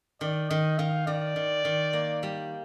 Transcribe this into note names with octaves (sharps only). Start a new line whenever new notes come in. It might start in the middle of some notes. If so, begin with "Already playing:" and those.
D#3 D5
D#3 D#5
D#3 F5
D#3 D5
D#3
D#3
A#3
G3